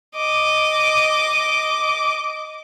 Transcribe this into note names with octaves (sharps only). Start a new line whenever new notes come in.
D#5 D6